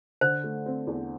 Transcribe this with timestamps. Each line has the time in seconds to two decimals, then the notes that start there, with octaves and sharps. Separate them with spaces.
0.21 D3 C5
0.44 A3
0.66 C4
0.87 E2